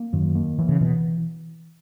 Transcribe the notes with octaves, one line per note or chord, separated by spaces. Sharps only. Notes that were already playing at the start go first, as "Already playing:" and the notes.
Already playing: A#3
F#2 D#3
A#3
E3
C#3
B2 E3